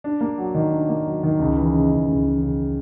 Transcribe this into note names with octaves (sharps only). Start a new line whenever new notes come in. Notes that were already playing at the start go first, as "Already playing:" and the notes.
D4
A#3
F#3
D#3
D4
A#3
F#3
D#3
C#2
E3
C#3
C#2
C#2
E3
C#3